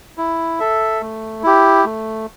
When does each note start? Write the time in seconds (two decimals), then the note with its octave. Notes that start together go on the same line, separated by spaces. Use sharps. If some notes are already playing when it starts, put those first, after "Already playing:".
0.18 E4
0.60 A4 E5
1.01 A3
1.43 E4 G4
1.85 A3